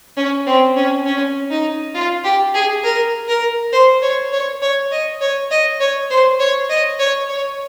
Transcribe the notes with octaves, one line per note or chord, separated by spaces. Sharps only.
C#4
C4
C#4
C#4
D#4
F4
G4
G#4
A#4
A#4
C5
C#5
C#5
C#5
D#5
C#5
D#5
C#5
C5
C#5
D#5
C#5
C#5